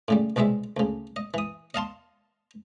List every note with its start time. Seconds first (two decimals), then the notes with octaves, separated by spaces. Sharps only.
0.08 A2 C#3 G3
0.36 C2 B2 G3 G#3 E5
0.77 D2 C#3
1.16 D#5
1.34 E3 D#6
1.74 D#5 F5 A5 C6